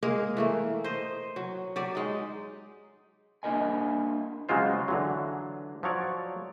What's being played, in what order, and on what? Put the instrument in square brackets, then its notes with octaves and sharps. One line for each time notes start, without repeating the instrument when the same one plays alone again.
[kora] G#3 A#3 G#4 A#4
E3 A3 A#3
C5 D#5
F#3
F#3 G4 D5
G#3 D#4
[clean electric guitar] A#3 D4 E4 A#4 D#5 G#5
[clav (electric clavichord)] C#3 F#3 G#3 F4 C5
D3 E3 F#3
F3 F#3 C#5 D5